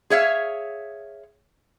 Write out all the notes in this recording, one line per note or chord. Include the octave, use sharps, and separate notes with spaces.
G#4 C#5 E5 F5